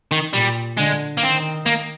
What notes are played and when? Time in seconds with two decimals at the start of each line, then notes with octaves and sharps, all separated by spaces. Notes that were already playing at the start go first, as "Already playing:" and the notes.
0.11 D#3
0.34 A#2 G3
0.78 D3 G#3
1.17 A#3
1.22 D#3 C4
1.66 A#3